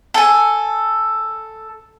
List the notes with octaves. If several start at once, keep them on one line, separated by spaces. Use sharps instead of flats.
A4 G#5